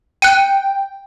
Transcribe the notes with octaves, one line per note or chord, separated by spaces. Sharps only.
G5 F#6 C#7 D#7